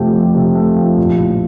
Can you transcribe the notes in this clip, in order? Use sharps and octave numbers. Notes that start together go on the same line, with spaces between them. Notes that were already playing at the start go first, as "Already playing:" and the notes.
Already playing: F2 C3 F3 A3 G4
F2
C3
A3
F3
A#1
A2